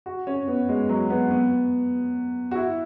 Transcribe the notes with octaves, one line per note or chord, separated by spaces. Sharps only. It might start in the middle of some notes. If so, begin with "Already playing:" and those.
F#4
C#4
B3
G#3
F#3
B3
B3
F#4
E4